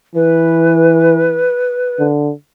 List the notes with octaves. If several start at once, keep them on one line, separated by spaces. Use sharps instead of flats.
E3 B4
D3